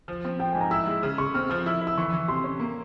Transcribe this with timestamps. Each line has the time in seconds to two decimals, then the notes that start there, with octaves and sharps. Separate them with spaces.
0.08 F3
0.25 C4
0.40 F3 G5
0.53 G#2 G#5
0.61 A#5
0.71 E4 E6
0.87 G#3
1.02 C#3 E6
1.18 C#3 C#6
1.34 C4 F6
1.50 F3 F6
1.66 E4 E6
1.81 E4
1.87 E6
1.97 E3 C#6
2.13 E3
2.28 C3 C6
2.44 C#4
2.60 A#3